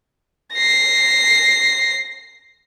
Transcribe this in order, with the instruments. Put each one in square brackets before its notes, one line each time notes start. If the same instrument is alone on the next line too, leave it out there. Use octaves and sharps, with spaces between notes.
[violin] A#6 C7